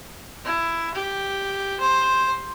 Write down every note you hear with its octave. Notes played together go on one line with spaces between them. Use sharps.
E4
G4
C5